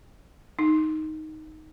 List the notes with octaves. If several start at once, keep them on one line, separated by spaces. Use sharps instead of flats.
D#4